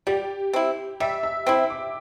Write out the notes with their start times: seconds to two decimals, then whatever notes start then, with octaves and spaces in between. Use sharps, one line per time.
0.07 G3 G4
0.53 C4 E4
1.00 G3 E5
1.23 E5
1.47 C4 E4 G5
1.70 D6